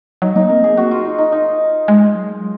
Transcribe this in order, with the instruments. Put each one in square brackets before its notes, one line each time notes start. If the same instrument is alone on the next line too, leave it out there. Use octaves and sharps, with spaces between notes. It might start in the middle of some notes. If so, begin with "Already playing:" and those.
[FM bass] F#3 [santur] D#4
[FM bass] A#3 [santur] D#4
[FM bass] C4 [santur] A#4
[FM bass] A#3 [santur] G#4
[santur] F#4
F4
D#4
D#4
D#4
[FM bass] G#3
F#3